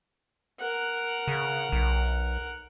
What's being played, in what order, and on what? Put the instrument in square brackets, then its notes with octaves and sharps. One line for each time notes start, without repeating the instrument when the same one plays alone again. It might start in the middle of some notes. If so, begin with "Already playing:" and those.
[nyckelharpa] A#4 F#5
[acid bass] C#3
B1